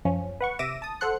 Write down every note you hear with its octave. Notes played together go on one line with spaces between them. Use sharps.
F#2 F3 C#4
B4 F#5 C#6
C3 E5 D6 A#6 D#7 E7
A5 D#6
A4 C5 F#5 C6 F#6 C#7